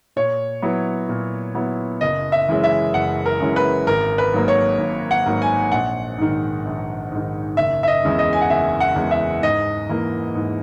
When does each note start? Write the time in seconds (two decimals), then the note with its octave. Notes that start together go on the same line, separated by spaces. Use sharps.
0.16 A#2 C#5
0.62 F#3 B3 E4
1.09 A#2
1.55 F#3 B3 E4
2.01 F#1 D#5
2.32 E5
2.48 F#2 E3 G#3 C#4
2.64 E5
2.94 F#1 F#5
3.26 A#4
3.40 F#2 E3 G#3 C#4
3.56 B4
3.87 G#1 A#4
4.18 B4
4.33 G#2 F#3 A#3
4.48 C#5
4.79 G#1
5.11 F#5
5.26 G#2 F#3 A#3
5.42 G#5
5.72 A#1 F#5
6.18 G#2 D#3
6.65 A#1
7.12 G#2 D#3
7.57 F#1 E5
7.83 E5
7.88 D#5
8.04 E2 C#3 G#3
8.19 D#5
8.33 G#5
8.41 F#5
8.50 F#1 E5
8.80 F#5
8.96 E2 C#3 G#3
9.11 E5
9.43 G#2 D#5
9.89 E3 A#3
10.35 G#2